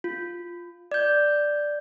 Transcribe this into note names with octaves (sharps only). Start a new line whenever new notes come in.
F4
D5 G6